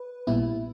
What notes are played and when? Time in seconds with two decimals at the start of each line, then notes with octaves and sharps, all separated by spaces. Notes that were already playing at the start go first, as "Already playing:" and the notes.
Already playing: B4
0.27 A#1 A#2 G3 B3 E4